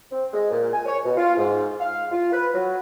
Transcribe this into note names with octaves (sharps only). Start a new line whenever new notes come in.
C4
G#3
A#2
G#5
C#5
B2
F4
G#2
F5
F4
B4
F#3